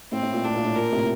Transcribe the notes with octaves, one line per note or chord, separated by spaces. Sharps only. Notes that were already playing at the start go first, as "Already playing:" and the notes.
A2 C4
A2
A#2
A2 D4
A#2
A2
A#2 A#4
A2 C3